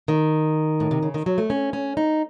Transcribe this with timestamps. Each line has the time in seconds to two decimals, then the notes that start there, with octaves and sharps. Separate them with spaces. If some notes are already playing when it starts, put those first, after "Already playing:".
0.08 D#3
0.80 A2
0.91 C3
1.03 C#3
1.14 D#3
1.26 F#3
1.38 A3
1.50 C#4
1.73 C#4
1.97 D#4